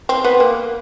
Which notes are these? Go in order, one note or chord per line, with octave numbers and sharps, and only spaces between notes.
C4
B3
A#3